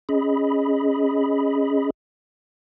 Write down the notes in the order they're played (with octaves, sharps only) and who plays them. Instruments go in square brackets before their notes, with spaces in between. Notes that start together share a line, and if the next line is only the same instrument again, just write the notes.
[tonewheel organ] C#4 G#4 D#5 B5